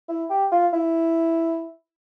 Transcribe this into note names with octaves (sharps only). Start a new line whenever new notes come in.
E4
G4
F4
E4